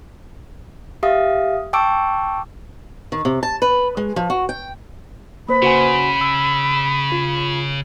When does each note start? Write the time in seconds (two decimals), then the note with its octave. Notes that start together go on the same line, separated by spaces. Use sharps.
1.03 G4 E5 F5 D#6
1.73 G5 A5 C#6 D6 E6 D7
3.12 D#3
3.25 C3
3.43 A5
3.62 B4
3.97 G#3
4.16 F3
4.30 F#4
4.49 G5
5.49 A#3 B4 C5 B5
5.62 C#3 F#4 F#5 G#5
6.21 E6
7.12 F4